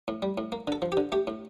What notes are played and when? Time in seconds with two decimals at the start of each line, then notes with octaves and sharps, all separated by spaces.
0.08 A2
0.22 G3
0.38 A2
0.52 A#3
0.67 D3 A4
0.82 F3
0.92 G4
0.97 D3
1.12 A3 G4
1.27 A2